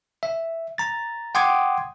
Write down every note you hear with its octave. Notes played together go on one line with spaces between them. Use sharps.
E5
A#5 A6
F#5 G5 C6 D6 D#6 G#6